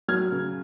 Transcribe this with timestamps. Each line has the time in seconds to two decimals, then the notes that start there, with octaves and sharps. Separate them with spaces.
0.08 F#3 F6 G#6
0.32 C#3